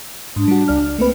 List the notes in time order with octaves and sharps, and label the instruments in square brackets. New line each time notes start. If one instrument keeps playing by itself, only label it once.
[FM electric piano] G#2 [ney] D4
[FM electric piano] G3 F#4
C#2 D5 F6
[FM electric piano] A3 A#3 B4 [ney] C4